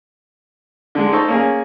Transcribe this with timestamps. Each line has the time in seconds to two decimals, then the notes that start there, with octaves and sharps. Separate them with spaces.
0.95 D3 G#3
1.12 D#4 A4 C5 C#6
1.28 A#3 C#4 G#4